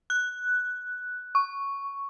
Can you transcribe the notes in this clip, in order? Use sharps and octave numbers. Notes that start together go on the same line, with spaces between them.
F#6
C#6